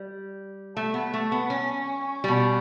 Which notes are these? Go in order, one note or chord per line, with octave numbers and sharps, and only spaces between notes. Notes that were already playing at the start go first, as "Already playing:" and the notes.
Already playing: G3
A3
B3
A3
B3
C#4
B2 G3